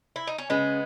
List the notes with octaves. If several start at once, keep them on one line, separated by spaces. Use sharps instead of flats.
E4
D#4
C#4
C#3 G#3 B3